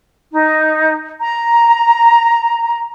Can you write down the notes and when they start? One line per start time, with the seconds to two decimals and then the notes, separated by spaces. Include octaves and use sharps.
0.32 D#4
1.21 A#5